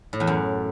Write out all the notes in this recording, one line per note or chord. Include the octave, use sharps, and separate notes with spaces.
A2
E2
F#2